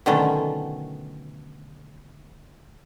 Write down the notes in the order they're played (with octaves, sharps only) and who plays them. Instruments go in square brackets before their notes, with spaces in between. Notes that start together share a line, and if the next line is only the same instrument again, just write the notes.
[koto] B2 D3 D#3 F#3 A3 C#4